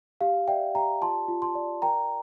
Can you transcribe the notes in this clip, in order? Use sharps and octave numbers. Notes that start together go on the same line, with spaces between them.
G4 F5
D5 E5 G5
G4 G5 A#5
F4 A5 C6
F4
A5 C6
D5
A#4 G5 A#5